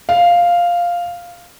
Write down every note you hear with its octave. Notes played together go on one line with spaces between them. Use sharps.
F5